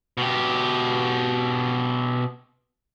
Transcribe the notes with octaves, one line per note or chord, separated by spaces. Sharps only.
B2 G4